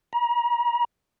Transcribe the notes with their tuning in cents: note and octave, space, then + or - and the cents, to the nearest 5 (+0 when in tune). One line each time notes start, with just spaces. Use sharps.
A#5 +40